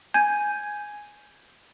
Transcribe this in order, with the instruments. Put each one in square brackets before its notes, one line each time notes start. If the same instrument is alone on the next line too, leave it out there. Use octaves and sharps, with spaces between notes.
[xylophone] G#5 G6 G#6 D#7